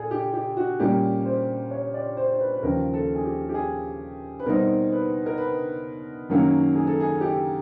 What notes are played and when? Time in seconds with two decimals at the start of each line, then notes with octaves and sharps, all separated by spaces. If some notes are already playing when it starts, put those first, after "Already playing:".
Already playing: A#2 G#4 A4
0.11 G4
0.34 G4
0.57 F#4
0.80 A#2 G3 A#3 C#4 G4
1.25 C5
1.71 C#5
1.94 D5
2.17 C5
2.33 C5
2.40 B4
2.54 B4
2.63 D#2 C#3 F3 A#4
2.94 A4
3.15 G#4
3.24 G4
3.49 G4
3.54 G#4
4.39 B4
4.46 B2 G3 C4 D#4 A#4
4.92 B4
5.26 A#4
5.38 B4
6.29 F#2 D#3 F#3 A#3 C#4
6.75 G#4
6.87 A4
7.00 G#4
7.21 G4